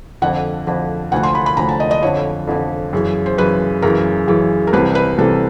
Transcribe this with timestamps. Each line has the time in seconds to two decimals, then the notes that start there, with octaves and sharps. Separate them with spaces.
0.22 F2 D3 F3 F#5
0.67 F2 D3 F3
1.12 D2 D3 F3 F#5
1.23 C6
1.35 B5
1.46 B5
1.57 D2 D3 F3 A#5
1.69 A5
1.80 D#5
1.91 D#5
2.02 F2 D3 F3 C#5
2.47 F2 D3 F3
2.93 F#2 C#3 E3
3.26 C5
3.38 F#2 C#3 E3 B4
3.82 F#2 C#3 E3 A#4
4.28 F#2 C#3 E3
4.67 A#4
4.73 C2 C3 E3 B4
4.95 B4
5.18 C2 C3 E3 A4